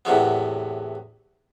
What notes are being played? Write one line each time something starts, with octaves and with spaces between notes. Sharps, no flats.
E2 A2 C3 F#3 B3